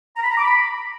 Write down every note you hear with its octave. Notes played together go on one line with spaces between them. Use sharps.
A#5
B5
A#5
D6
B5